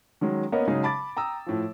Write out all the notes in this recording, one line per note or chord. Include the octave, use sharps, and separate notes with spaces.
D#3 F#3 G#3 C#4
A#3 B3 C#4 A#4 C#5 D#5
C#3 F#3 G#3 D#4 G#4
A5 B5 D6 A6
G5 A#5 D#6 E6
A2 F3